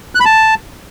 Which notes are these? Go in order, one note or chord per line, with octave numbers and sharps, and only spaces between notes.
F#6
B5
A5